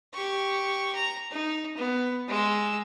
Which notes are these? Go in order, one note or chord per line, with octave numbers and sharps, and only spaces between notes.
G4 C#6
A#5
D#4
B3
G#3 E6